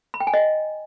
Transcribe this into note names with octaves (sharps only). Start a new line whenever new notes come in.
B5
G5
G#5
D#5